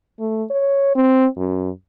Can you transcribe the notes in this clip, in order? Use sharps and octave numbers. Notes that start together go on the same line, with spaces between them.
A3
C#5
C4
F#2